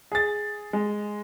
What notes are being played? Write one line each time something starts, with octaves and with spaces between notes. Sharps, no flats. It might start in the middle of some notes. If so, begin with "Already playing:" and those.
G#4 A6
G#3